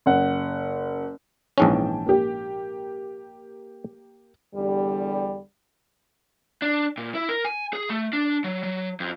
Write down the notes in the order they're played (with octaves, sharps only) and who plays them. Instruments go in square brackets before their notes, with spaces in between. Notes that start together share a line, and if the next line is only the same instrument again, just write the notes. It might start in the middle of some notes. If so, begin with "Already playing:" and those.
[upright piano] F#1 F#5
[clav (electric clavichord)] A#1 G#2 C#4 [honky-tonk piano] E3 G5 A5
[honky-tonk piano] A#3 G4
[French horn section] E2 D3 G3
[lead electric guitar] D4
A#2
E4
A#4
G#5
G#4
A3
D4
F#3
F#3
F2